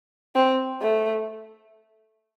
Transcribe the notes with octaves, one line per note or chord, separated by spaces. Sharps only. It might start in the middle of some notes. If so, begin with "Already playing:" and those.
C4
A3